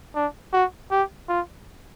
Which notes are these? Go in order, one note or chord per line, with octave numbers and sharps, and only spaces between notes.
D4
F#4
G4
F4